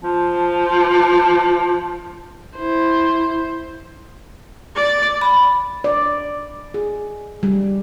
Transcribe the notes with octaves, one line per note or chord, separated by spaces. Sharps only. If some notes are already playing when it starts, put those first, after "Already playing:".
F3 A5
E4 C5
D5
B5
D5
G#4
G3